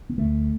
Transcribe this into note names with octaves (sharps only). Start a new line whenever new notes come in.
A#3
D2 A3